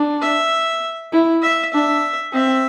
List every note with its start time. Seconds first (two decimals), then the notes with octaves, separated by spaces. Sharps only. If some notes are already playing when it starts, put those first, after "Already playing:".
Already playing: D4
0.22 E5
1.12 E4
1.43 E5
1.73 D4 E5
2.33 C4 E5